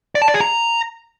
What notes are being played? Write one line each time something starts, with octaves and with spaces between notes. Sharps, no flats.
D5
A5
D5
G#4
A#5